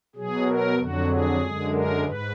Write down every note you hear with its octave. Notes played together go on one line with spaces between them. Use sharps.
B2 F#3 G#4
A#4
F2 D3 F#3 F#4
G#4
F#2 D3 G#3
A#4
G#2 B4